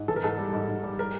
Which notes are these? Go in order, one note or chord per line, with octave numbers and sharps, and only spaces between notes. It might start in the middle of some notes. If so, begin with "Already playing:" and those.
Already playing: G#2
E3 A4
A#4
G#2 A4
G3
G#2
G#2
G3
A#4